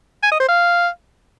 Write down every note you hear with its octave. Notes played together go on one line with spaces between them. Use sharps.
G#5
D#5
C5
F5